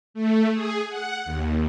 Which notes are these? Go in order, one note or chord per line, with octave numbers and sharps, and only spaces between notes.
A3
G#4
F#5
D#2